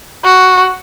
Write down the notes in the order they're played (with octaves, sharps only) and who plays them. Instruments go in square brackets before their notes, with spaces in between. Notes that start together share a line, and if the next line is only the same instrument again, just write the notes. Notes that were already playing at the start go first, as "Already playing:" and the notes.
[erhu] F#4